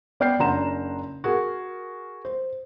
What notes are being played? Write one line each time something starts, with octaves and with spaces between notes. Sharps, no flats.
B3 D5 G5 F6 G6 C7
F#1 D4 F#5 A#5 C6 E7
F#4 G#4 A#4
C5